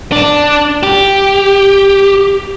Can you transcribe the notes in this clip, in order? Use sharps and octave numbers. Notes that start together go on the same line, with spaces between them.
D4
G4